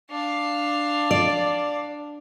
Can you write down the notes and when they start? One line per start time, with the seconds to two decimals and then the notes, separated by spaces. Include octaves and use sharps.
0.11 D4 F5
1.11 D5